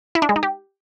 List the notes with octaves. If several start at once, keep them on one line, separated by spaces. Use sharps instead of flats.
E4
D4
G#3
D#4
G4